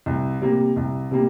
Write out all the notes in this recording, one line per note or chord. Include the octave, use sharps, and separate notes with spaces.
C2
C3 G3 A#3
C2
C3 G3 A#3